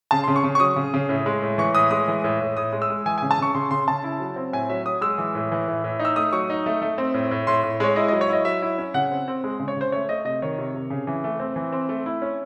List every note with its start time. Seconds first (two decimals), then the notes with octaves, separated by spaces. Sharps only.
0.11 C#3 A5
0.24 C6
0.28 C#3
0.36 C#6
0.44 C#3
0.55 C#6
0.60 F#3 D#6
0.76 C#3
0.94 C#3
1.09 A2
1.26 G#3
1.42 A2
1.58 E3 C#6
1.75 A2 D#6
1.91 G#3 D#6
2.08 E3
2.24 A2
2.41 A2
2.57 A2 D#6
2.73 G#3
2.82 E6
2.90 G#3
3.06 E3 G#5
3.18 G#5
3.22 C#3
3.31 A5
3.38 C#3 C#6
3.55 C#3 C6
3.71 C#3 C6
3.88 C#3 A5
4.04 E4
4.20 F#3
4.36 C4
4.53 A2 G#5
4.69 F#3 E5
4.86 F#3 D#6
5.01 G#3 E6
5.18 E3
5.35 A2
5.52 E3
5.68 A2
5.84 A2
5.99 D#4
6.05 E6
6.16 A3 D#6
6.33 F#3 C#6
6.50 D#4
6.66 A3
6.82 A3
6.98 C4
7.14 A2
7.31 A2
7.47 A2 C6
7.63 A2
7.80 G#3 C#5
7.96 E4 D#5
8.08 D#5
8.13 F#3
8.21 C#5
8.29 E4 D#5
8.45 F#3 E5
8.62 E4
8.78 C#4
8.94 C#3 F#5
9.10 C4
9.28 C4
9.44 G#3
9.60 C#3
9.68 C#5
9.77 C#3 C5
9.92 A3 C#5
10.09 A3 D#5
10.25 C3 D#5
10.42 D#3 C#5
10.58 C3
10.74 C3
10.90 C#3
11.07 E3
11.24 A3
11.40 C4
11.56 E3
11.72 C4
11.89 A3
12.06 E4
12.22 C#4